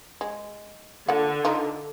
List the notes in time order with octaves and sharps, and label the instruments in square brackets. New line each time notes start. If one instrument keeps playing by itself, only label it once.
[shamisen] G#3
[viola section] D3 [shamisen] A#3 F4 F#5
[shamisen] D#3 D#4 F4